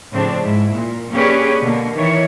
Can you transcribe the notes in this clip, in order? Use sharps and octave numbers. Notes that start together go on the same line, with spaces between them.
A2 C#3 F3 C4 D4
G#2 E4
A#2
A#3 C#4 D4 G4 G#4 B4
B2 D3 A#3
D#3 E3 C#5